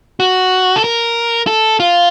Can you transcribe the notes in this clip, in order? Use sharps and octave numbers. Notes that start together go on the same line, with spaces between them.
F#4
A4
A#4
A4
F4